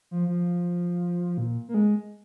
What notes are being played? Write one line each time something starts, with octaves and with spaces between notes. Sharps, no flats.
F3
F3
A#2
A#3
G#3